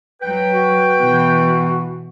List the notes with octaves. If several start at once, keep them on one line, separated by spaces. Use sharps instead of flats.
F#3 B4 G5
F#4
B2 E3